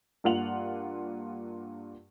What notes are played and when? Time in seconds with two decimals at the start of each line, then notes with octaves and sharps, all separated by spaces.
0.24 G2 A#3 F4 F#5 F7 F#7